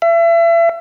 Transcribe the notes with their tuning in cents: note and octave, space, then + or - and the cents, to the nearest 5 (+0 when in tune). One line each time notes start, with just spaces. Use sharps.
E5 +35